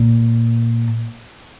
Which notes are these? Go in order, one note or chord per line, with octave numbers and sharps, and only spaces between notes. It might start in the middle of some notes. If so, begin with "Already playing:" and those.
Already playing: A#2